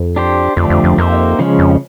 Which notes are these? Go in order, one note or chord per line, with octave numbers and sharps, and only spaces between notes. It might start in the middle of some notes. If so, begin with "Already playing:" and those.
Already playing: F2
D4 G4 C5
F2 D3 F3 A3 D4 G4
F2
F2
F2 A#3 D#4 G4 C5 E5
C#3 F3 G#3 C#4
F2